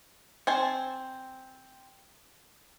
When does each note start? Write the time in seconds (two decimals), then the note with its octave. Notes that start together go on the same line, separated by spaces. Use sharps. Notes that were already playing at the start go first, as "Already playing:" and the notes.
0.47 C4 C5 G#5 A5